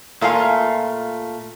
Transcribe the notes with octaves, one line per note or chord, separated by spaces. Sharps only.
A#2 A3 F4 F5 G#5